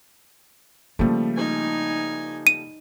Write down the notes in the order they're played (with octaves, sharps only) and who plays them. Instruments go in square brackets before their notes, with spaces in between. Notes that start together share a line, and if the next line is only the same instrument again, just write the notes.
[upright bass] C#3 A#3 [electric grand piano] F3 G3 A3
[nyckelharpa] D#4 G#5
[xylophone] D#7